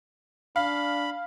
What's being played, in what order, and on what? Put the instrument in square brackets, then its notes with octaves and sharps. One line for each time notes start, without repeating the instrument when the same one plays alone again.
[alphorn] D4 [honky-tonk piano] F5 [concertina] B5